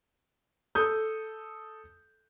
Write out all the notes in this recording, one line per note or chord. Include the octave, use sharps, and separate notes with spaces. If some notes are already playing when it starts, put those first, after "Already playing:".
A4 D#6 G6